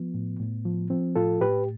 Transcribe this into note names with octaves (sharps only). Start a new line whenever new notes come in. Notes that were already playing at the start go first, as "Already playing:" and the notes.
Already playing: F3 B3
A2
A2
F3
F3 C4
A2 F4 A4
A2 G4 B4